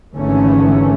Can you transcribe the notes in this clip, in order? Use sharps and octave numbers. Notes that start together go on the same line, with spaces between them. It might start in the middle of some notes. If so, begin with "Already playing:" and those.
G#1 D3 E3 A3 C#4